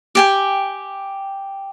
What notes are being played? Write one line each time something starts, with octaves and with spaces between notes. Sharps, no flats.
G4 G5 G#5